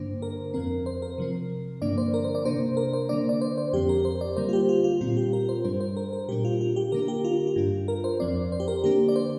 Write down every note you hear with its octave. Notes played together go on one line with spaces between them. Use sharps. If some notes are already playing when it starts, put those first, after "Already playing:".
Already playing: G2 D3 A#3 D4 C5
A#4
F2 F3 C4 A#4
C5
A#4
C3 F3 C4
G2 D3 F3 A#3 D4 D5
C5
A#4
C5
D5
C3 A#3 D4 C5
A#4
C5
D3 A#3 D4 D5
D5
C5
C5
F2 F3 C4 G4
A#4
C5
D5
D3 G3 A#3 C5
F4
G4
F4
F4
A#2 G3 C4 F4
G4
A#4
C5
G2 G3 D4 C5
C5
A#4
A#4
A#2 G3 D4 G4
F4
F4
G4
D3 A#3 D4 A#4
G4
F4
F4
G2 G3 D4
A#4
C5
F2 F3 C4 D5
C5
G4
A#4
D3 A#3 D4 G4
D5
C5